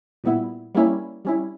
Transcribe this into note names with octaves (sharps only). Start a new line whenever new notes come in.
A#2 G3 B3 E4
G3 A#3 C#4 E4
G3 C#4 E4